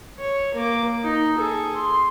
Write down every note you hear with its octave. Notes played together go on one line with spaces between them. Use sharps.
C#5
A#3 D6
D#4
G#4 A4
C6